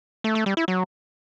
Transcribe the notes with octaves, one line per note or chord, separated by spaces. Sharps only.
A3
A3
G3
E4
F#3